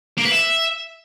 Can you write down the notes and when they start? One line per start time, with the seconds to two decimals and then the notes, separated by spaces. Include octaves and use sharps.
0.18 A#3
0.25 B4
0.32 E5